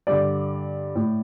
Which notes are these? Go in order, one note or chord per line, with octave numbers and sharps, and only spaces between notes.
G2 D3 D5
A2